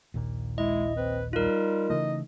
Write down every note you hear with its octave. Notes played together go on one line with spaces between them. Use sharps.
A#1 D#2 A#2
G#3 E4 D#5
C4 B4
G3 D#4 F4 A#4
C#3 E3 A3 D#5